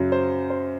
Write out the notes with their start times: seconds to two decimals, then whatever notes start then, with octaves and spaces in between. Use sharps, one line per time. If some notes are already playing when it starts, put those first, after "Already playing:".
Already playing: F#2 C#3 F#3
0.12 C5
0.50 C5